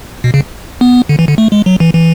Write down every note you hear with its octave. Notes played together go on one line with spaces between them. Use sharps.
B2
C#3
B3
D3
E3
D3
A3
G#3
F#3
E3
E3